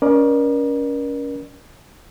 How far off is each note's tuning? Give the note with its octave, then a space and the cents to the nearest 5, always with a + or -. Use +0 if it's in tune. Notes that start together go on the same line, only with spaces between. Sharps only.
C#4 +25 A#4 +35 D5 +35